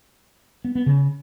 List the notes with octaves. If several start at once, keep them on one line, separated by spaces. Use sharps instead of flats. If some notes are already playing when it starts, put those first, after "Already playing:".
B3
B3
C#3